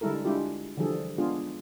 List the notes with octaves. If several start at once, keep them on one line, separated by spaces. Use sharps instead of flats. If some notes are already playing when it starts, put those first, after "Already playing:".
D3 G3 G#3 E4 A4 A#4
G#3 D4 E4 F4 G4
D3 E3 F3 G3 G#4 A4
G#3 B3 D4 F4 G#4